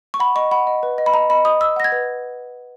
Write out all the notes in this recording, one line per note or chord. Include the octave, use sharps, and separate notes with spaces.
C#6
F#5 B5
D#5 C#6
F#5 B5
D#5
B4
D#5
B5
D#5 A#5
D#5 B5
D#5 D#6
D#5 E6
F#5 A#6
G#6
B4